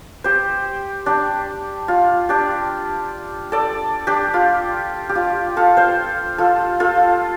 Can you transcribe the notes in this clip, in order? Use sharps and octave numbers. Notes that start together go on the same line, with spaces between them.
G4 C5
D4 G4
F4
D4 G4
A4 D5
D4 G4
F4
G4
F4
F4 A4
C5 F5
F4 A4
F4 A4